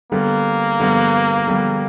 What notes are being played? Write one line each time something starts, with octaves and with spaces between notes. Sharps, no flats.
D3 G3 A#3 B3
D3 G3 B3
D3 G3 B3